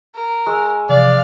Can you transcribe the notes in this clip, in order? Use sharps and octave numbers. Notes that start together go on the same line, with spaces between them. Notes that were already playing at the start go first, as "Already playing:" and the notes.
A#4
G#3 C#6 E6
C3 E3 F3 D5 F5